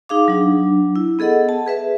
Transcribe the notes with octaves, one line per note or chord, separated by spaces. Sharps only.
D#4 G#4 F5 D6
F#3 D4
E4
B3 G#4 A4 D#5 F#5
A5
G#4 B4 E5